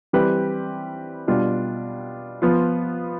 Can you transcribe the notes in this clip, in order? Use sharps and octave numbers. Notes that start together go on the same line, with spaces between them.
E3 G3 C4 G4 B4
B2 G3 D4 F4
F3 B3 F4